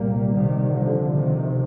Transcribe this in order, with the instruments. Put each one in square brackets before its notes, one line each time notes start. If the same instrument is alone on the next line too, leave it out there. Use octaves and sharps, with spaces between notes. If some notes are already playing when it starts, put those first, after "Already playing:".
Already playing: [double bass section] C2 A#2 G3 A#3
C2 C3 D#3 G3
D3 F3
D2 C3 D#3